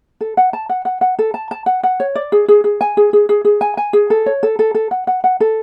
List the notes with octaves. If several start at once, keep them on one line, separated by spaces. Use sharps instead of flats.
A4
F#5
A5
F#5
F#5
F#5
A4
A5
A5
F#5
F#5
C#5
D5
G#4
G#4
G#4
G#5
G#4
G#4
G#4
G#4
G#5
G#5
G#4
A4
C#5
A4
A4
A4
F#5
F#5
F#5
A4